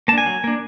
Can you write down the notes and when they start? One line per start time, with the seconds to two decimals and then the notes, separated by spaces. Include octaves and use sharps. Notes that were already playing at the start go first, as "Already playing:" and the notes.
0.08 A#3 A5
0.13 D4 G#5
0.26 F#3
0.44 A#3 D4